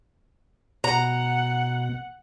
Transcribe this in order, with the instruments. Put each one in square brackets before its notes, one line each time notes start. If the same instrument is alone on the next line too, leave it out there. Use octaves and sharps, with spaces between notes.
[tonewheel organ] B2 [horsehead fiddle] F#5 [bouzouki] A#5